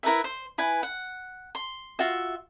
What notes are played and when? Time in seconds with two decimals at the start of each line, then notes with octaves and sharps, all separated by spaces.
0.03 E4 A#4 B4 E5
0.24 C5
0.58 E4 B4 G#5
0.83 F#5
1.55 C6
1.99 F4 F#4 E5